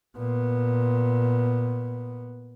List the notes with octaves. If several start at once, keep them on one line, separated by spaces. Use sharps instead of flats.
A#2 B3